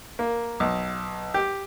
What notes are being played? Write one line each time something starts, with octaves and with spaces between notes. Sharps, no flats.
A#3
B1
G4